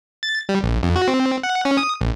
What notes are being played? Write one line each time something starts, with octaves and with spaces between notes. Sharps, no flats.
A6
G3
A#1
F2
F#4
C4
F#5
C#4
D#6
A#1